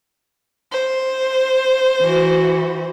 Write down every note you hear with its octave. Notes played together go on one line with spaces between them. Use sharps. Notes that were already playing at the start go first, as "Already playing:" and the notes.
C5
E3 F#4